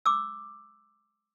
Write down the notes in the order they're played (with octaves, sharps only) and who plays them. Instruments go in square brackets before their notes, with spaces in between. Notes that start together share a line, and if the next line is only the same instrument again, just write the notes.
[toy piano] D6 E6